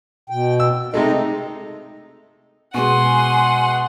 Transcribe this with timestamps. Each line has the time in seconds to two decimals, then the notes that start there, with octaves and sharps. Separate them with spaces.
0.30 B2 G5
0.60 E6
0.94 C3 G#3 A3 D#4 D#5
2.74 B2 G#3 F#5 G#5 C6